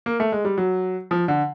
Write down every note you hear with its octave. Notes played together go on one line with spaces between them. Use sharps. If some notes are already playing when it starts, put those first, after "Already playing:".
A#3
A3
G#3
G3
F#3
F3
D3